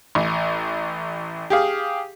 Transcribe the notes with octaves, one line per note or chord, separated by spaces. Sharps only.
A1
G4 G#4 F5